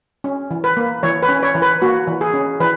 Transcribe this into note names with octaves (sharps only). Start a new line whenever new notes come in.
C#4
E3
B4
A#3
E3 C#5
B4
C#4
C#5
E3
B4
A#3 F#4
E3
G#4
C#4
E3 B4